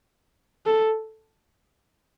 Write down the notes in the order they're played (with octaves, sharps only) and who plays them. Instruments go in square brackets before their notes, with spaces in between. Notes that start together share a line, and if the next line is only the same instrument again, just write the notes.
[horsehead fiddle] A4